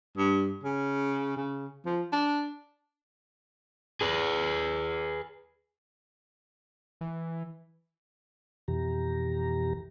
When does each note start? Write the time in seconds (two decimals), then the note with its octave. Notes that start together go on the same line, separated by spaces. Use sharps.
0.18 G2
0.63 C#3
1.37 C#3
1.85 F3
2.12 D4
4.01 G#4 B4
7.01 E3
8.68 F2 B2 E3 G4 A#5